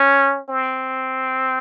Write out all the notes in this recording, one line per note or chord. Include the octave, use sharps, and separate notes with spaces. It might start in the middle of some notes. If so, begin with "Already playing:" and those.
Already playing: C#4
C4